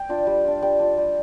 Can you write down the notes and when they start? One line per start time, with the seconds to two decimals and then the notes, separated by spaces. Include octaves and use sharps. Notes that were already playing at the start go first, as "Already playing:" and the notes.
Already playing: G5
0.09 D4 F4
0.27 G3
0.44 D4 F4
0.62 G3 G5
0.79 D4 F4
0.98 G3